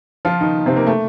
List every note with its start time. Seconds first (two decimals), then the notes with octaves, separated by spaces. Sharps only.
0.25 F3 F4
0.41 D#3 D#4
0.66 C3 C4
0.76 A#3
0.87 A3